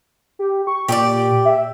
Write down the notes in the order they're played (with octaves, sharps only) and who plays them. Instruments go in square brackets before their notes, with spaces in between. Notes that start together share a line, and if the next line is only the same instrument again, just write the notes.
[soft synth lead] G4
C#6
[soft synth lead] A#2 [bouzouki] G4 G#4 D5
[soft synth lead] E5